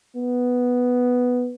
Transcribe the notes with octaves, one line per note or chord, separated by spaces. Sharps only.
B3